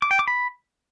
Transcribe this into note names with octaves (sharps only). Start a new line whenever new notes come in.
D6
G5
D6
B5